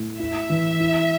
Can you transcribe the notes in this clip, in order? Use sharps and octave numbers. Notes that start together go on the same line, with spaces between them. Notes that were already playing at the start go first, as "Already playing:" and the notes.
Already playing: A2
E4 E5
E3
E4